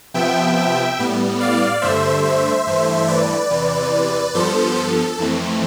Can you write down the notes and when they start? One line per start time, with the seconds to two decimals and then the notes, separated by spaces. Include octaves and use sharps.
0.14 C3 F3 B3 E5 G5
0.56 E5 G5
0.99 A2 G3 B3
1.40 D5 F5
1.82 G2 D3 A3 C5 E5
2.24 C5 E5
2.67 G2 E3 A3
3.08 B4 D5
3.50 E2 C3 E3
4.34 G2 F3 B3 A4 C5
4.76 A4
5.18 F2 E3 A3 C4